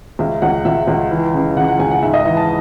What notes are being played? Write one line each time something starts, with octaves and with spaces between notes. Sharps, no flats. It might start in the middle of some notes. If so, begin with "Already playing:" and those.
C#2 E5
C#2 F#5
C#2 E5
C#2
E3
C#3
C#3 F#5
F#5
C#2 G#5
F#5
G#2 E5
D#5
E3 E5
A5